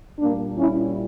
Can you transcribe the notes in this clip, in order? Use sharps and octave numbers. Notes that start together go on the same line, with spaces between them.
A#2 G3 A#3 D4
C#4 E4